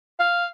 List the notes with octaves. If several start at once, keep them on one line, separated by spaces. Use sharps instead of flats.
F5